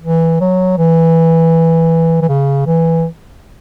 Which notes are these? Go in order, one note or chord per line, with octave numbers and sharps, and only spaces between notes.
E3
F#3
E3
E3
C#3
E3